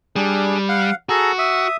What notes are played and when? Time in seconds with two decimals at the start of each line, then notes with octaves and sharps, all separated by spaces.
0.16 G3 D4 G#4
0.69 F5 F#5
1.09 F#4 G#4 A4 A#5
1.38 E5 D#6